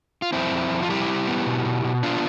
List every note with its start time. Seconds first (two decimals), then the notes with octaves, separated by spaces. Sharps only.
0.22 F4
0.32 F2 C4 E4
0.52 F2
0.71 F2
0.83 F4
0.90 G3 E4 G4
1.08 G3
1.27 B3
1.46 B2
1.65 B2
1.84 B2
2.03 B3 D4 F4